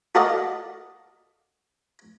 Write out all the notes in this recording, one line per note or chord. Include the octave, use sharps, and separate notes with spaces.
F#4 A4 A#4 D5 D#5 F5